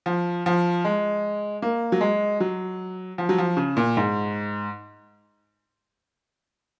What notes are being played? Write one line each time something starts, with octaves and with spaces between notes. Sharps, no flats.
F3
F3
G#3
A#3
F#3
G#3
F#3
F3
F#3
F3
C#3
A#2
G#2